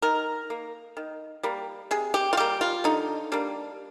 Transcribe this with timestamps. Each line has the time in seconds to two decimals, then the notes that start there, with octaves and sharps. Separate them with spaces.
0.02 D#3 A#4
0.50 A#3
0.97 D#3
1.43 G3 A#3
1.91 C3 G#4
2.14 G4
2.33 F4
2.37 G3 A#3 G4
2.61 F4
2.84 D3 D#4
3.32 G3 A#3 D4